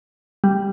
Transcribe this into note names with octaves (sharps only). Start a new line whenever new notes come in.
G3